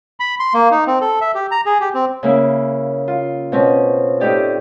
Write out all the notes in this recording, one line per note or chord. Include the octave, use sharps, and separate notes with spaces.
B5
C6
A#3
D#4
C4
A4
E5
G4
A#5
G#4
G4
C4
C#3 A#3 E4
F4
B2 C4 C#4
A2 D#4 G4 D5